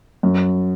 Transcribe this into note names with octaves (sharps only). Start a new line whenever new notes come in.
F#2